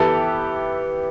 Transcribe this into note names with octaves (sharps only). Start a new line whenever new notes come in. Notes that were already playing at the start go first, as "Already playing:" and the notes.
Already playing: E3 B3 E4 G4 A4 B4